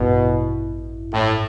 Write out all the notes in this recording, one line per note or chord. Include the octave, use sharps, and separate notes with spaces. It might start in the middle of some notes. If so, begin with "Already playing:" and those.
Already playing: A1 G2 B2 E4
A2